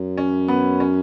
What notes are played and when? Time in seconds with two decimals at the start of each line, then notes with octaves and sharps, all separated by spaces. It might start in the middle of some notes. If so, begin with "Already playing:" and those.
Already playing: F#2
0.17 C#4
0.48 B3
0.80 C#4